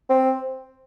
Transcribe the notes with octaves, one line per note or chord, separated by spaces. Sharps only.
C4